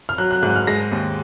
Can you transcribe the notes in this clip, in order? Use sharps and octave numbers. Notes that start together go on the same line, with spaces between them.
F6
F#3 F#6
F#6
G#2 F#6
F6
G#3 A#6
D#2